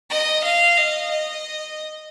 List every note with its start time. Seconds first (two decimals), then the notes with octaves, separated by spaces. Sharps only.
0.10 D#5
0.44 F5
0.77 D#5
1.11 D#5